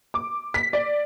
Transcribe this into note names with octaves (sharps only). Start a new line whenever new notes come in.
D6
B6
D5